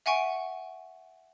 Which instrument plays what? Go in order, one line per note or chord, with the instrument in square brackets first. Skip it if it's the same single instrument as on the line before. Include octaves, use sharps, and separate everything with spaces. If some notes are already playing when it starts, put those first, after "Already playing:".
[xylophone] E5 F#5 G#5 C#6 D7